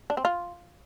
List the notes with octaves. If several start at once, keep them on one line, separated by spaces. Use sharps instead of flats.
D4
C4
F4